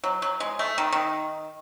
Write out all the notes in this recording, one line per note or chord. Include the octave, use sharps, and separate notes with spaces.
F#3
F#3
G#3
A3
D#3
D#3